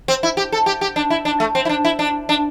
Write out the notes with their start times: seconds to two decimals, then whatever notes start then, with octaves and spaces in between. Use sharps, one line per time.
0.08 C4
0.23 E4
0.37 G4
0.52 A4
0.66 G4
0.81 G4
0.96 D4
1.10 E4
1.25 D4
1.40 A3
1.55 C4
1.65 E4
1.69 D4
1.85 E4
1.99 D4
2.29 D4